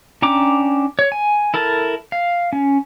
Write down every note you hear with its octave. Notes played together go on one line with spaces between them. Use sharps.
C#4 D4 G5 A#5 D6
C#5
G#5
E4 A4 A#4 A5
F5
C#4